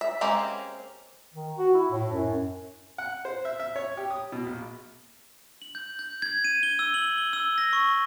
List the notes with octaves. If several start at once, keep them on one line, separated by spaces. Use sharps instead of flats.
E5
G#3 A#3 C4 C#4 G4
D#3
F#4
E4
A2
F#2
F#5
C5
E5
E5
C#5
G4
D#6
B2
A#1
F#7
G6
G6
G#6
D#7
G7
E6
F#7
G7
E6
A#6
C#6